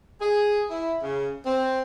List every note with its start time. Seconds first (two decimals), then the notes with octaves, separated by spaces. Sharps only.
0.21 G#4
0.70 E4
1.02 C#3
1.46 C4